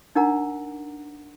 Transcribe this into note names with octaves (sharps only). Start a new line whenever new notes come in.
D4 D#4 A#4 F#5 A#5